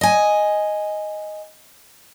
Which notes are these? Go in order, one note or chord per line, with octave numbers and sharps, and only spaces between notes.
D#5 G#5